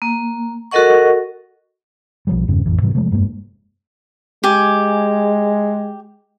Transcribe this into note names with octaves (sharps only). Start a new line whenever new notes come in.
A#3
F#4 A4 A#4 D#5 F#5 C#6
B1 F3 G3
E2 G2 C#3
A1 F2 E3
G#2 C3 E3 G3
C3 F3 G#3 A3
F1 G2 G#3 A#3
G#3 G4 G#5